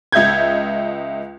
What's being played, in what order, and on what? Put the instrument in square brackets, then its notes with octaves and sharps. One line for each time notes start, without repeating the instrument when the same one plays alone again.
[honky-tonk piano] C#2 D#5 E5 G6 G#6